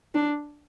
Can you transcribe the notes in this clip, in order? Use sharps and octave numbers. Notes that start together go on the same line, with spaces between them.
D4